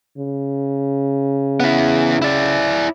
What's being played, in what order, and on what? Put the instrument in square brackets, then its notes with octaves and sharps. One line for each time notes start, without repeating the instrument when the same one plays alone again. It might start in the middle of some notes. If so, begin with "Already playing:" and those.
[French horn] C#3
[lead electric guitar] B3 E4
E4 D5